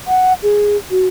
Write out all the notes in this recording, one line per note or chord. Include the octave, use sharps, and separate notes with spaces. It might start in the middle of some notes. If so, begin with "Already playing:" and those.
F#5
G#4
F#4